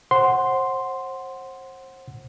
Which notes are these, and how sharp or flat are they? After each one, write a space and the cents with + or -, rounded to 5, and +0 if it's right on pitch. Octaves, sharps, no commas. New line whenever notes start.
C5 +30 F#5 +0 C6 +0